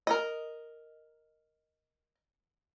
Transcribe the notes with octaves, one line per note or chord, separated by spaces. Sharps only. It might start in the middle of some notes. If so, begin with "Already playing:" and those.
A#4 D#5